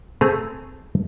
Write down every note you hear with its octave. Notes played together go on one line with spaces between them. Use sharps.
A3 C4 G#4 A#5